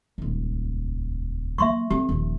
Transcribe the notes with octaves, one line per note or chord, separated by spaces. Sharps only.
D#1 C#2
F#3 A#3 E5 C6 C#6
D3 C4 G4
D#1 F3